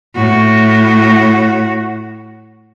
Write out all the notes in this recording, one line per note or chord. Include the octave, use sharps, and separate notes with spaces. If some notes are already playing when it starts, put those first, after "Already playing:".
A2 F#4